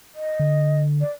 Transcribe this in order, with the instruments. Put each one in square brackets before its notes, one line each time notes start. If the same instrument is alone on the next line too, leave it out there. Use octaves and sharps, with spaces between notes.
[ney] D#5
[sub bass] D3
[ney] D5